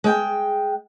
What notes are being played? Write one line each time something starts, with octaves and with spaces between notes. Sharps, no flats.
G#3 G5